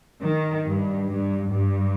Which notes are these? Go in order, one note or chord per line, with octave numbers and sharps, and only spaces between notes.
D#3
G2
G2
G2